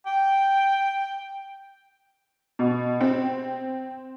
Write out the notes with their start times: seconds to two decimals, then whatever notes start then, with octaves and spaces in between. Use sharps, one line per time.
0.06 G5
2.59 B2
3.01 C4